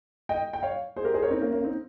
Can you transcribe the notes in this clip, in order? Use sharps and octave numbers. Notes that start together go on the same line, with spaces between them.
D#5 G5
G5
C#5 F5
G#4 C5
G4 A#4
G#4 C5
A#4 C#5
C4 D#4
A#3 C#4
A#3 C#4
C4 D#4